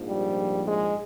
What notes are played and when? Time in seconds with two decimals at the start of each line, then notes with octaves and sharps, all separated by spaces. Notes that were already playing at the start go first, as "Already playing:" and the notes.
Already playing: A#1 G#2 F3
0.09 G3
0.68 G#3